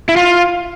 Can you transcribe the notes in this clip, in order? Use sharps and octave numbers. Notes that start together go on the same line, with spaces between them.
E4
F4